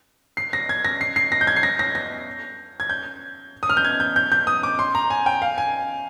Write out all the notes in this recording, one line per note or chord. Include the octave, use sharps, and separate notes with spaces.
C7
A#6
G#6
A#6
C7
C7
A#6
G6
G#6
C7
A#6
A#6
A#6
G#6
G6
D#6
F6
G6
G#6
G6
G6
G6
D#6
D6
C6
A#5
G#5
G5
F5
G#5